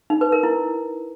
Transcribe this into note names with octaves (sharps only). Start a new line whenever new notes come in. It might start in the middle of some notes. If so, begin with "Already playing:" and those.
D#4
B4
A#4
E4